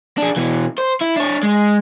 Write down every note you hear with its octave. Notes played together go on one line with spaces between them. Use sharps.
D4 G#4
B2 E3
C5
E4
D4 C#5
G#3